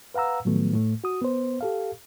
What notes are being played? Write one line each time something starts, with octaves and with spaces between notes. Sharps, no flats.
B4 F5 F#5 A#5 E6
A2 D#3 F3 F#3 A3 B3
A2 A3
F#4 D#6
B3 C5
G4 A4 F5